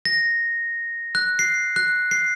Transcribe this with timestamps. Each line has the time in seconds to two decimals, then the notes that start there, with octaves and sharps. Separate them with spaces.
0.05 A#6
1.15 F#6
1.39 C7
1.76 F#6
2.11 C7